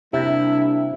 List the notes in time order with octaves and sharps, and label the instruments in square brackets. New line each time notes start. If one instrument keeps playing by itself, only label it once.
[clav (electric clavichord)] C3 [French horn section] G3 A#3 D4 [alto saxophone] E4